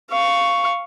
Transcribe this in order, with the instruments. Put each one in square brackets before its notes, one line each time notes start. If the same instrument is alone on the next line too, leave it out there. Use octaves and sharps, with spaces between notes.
[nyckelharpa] F5 C#6